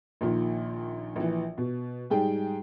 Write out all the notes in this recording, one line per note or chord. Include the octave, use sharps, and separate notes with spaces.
A#1 A#2 D#3
A#1 E3
B2
G#2 G3 G#4 G5